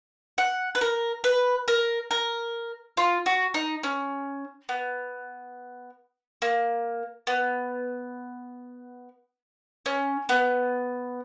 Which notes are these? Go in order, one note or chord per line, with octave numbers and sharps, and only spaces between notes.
F#5
B4
A#4
B4
A#4
A#4
F4
F#4
D#4
C#4
B3
A#3
B3
C#4
B3